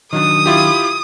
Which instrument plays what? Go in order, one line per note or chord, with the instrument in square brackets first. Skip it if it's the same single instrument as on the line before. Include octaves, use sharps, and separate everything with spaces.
[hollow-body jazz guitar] D#3 F#3 D4 [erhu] D#6
[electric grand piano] E4 F4 G4